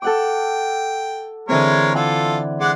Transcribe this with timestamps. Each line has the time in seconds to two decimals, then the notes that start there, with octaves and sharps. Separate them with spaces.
0.02 A4 F#5 G5 D6
1.49 D3 E3 G#3 C4 A#4 C#5
1.95 F4 A4 D5 F#5 G#5
2.61 G#3 D5 F#5